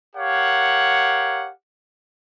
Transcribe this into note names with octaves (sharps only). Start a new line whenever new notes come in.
G4 A#4 C#5 F5 F#5